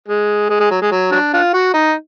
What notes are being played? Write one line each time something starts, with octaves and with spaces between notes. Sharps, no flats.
G#3
G#3
G#3
F#3
G#3
F#3
F#3 D4
D4 F4
F#4
D#4